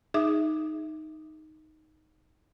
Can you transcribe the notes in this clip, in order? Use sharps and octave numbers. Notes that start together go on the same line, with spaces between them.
D#4 G#4 E5 D6 D#6